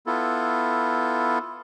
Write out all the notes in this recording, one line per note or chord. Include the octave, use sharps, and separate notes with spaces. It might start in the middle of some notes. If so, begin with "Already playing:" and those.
B3 E4 F4 A4